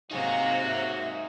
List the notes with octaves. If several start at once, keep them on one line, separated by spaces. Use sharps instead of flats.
C3 F#3 A#3 D#4 F#4 G#4 F5
E5